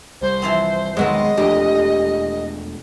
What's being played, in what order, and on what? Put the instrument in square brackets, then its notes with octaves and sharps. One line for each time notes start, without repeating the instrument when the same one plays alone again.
[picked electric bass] C2 G3 [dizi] C5
[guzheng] E3 F3 C4
[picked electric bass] E1 B1 D#3 [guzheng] F#3 [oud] G#3 B3 C4 [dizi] D#5
[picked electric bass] E1 A3 D4 [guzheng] F2 [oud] G4